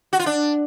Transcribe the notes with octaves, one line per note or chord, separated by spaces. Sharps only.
F#4
F4
D4